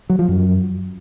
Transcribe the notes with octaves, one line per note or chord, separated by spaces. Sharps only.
F#3
F3
F#2